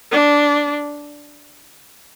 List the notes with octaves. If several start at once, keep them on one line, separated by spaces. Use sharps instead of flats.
D4